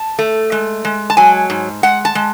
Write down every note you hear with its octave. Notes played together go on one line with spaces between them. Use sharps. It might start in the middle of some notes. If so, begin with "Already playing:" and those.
Already playing: A5
A3
G#3
G#3
A5
F#3 G#5
G#2
G#3 F#5
A5
G#3